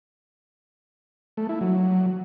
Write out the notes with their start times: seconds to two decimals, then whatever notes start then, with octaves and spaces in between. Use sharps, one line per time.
1.37 A3
1.49 E4
1.61 F#3